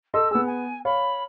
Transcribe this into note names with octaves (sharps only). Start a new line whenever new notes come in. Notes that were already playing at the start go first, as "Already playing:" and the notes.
A4 D#5 C6 E6
B3 G#4 E6
G#5
C#5 F5 B5